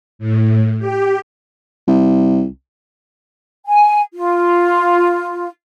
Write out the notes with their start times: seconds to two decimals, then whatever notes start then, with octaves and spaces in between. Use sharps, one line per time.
0.19 A2
0.79 G4
1.87 C2
3.67 G#5
4.14 F4